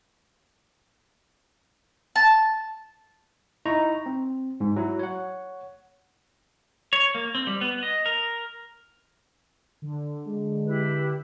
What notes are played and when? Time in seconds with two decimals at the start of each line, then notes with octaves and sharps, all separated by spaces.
2.16 A5
3.66 D#4 E4 A#5 C#6
4.06 C4
4.60 G#2
4.76 F#3 E4
4.99 C#5 F#5
6.93 C#5
7.15 A#3
7.35 C4
7.47 G3
7.61 B3
7.83 D#5
8.06 A#4
9.82 D3
10.26 G#3
10.66 E4 G4 B4